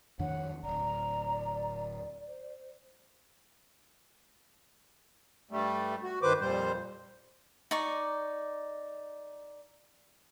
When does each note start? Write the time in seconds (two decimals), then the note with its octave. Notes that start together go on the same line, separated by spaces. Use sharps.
0.19 F2 D#3 D4 C#5 F#5
0.63 D1 G1 D5 A#5
2.27 C5
5.51 G2 G3 A3
6.03 F#4
6.22 G2 D#3 B4 C5 D6
6.40 F2 A#2 G3 C5
7.71 D#4 D5 C#6